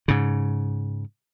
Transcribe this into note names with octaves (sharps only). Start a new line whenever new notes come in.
G#2 C#3